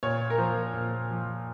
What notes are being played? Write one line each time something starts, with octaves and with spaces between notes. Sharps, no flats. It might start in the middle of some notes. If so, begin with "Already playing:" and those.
A#2 C#5
A#4
F3 C5
A#2
F3